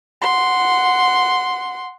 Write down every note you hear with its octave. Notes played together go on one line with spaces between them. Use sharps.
F#5 C6